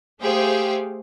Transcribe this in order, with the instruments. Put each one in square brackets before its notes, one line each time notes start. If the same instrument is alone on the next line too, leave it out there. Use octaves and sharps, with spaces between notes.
[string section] A3 G4 G#4 C5 F5 G5